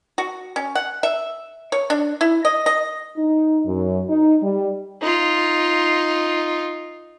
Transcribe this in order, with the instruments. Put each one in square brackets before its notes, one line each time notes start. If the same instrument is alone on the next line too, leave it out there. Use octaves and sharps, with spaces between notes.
[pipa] F#4
C#4
F#5
E5
C#5
D4
E4
D#5
D#5
[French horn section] D#4
F#2
D#4
G3
[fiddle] D#4 F4